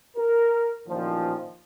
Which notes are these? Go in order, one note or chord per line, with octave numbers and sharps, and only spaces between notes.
A#4
A1 A#2 D#3 F3